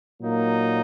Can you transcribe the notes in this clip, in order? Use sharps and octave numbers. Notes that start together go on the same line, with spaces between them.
A#2 F#3 A#3 D#4